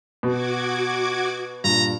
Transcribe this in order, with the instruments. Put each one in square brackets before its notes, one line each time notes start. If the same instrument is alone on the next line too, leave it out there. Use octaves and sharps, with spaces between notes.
[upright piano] B2 [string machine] F#4 D6 G#6
[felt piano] G2 A#2 [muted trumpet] A#5